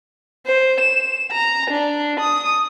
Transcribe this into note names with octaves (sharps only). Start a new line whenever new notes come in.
C5
E7
A#5
D4
D#6